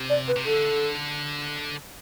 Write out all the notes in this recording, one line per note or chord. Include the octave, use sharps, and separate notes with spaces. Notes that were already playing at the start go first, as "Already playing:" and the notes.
Already playing: C3
D5
B4
C3
D3 A4